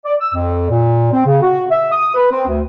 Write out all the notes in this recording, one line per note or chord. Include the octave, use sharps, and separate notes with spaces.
D5
E6
F2
A#2
C4
C#3
F#4
E5
D#6
B4
C4
D2